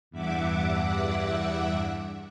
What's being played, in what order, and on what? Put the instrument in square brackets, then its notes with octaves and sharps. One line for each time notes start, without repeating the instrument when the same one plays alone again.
[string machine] E2 G2 E5 F#5 D6